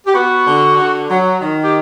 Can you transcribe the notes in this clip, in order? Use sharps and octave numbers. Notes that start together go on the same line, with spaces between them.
G4
B3 F#4
D3
D3
F#3
D#3
G4